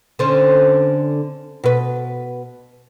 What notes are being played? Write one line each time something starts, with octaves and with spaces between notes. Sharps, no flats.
D3 C4 C#4
B2 B4